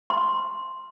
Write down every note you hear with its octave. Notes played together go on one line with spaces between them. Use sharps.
C6